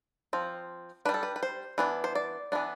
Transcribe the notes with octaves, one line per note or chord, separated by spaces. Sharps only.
F3 C4
G3 D4 B4
A4
B4
B4
C5
E3 B3 D4
C5
D5
E3 B3 D4